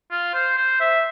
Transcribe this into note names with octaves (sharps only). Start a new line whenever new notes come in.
F4
C5
C5
E5